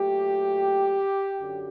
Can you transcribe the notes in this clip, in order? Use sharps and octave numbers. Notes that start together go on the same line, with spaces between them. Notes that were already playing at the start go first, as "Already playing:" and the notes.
Already playing: A#2 F#3 A3 G4
F#2 D3 F#3